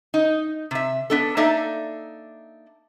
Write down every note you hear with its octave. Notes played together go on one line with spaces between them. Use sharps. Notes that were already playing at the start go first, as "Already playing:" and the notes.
D#4
C3 E5
B3 D4 A4
A#3 D4 D#4 A4 D5 E5